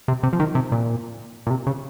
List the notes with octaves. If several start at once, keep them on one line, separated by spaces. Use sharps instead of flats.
C3
C3
F3
D#3
C3
A#2
A#2
C3
C#3